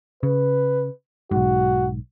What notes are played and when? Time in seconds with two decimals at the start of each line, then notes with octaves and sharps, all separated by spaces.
0.23 C#3 B4
1.31 B1 G#2 F#4